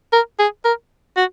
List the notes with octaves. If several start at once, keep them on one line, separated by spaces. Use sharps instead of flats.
A#4
G#4
A#4
F#4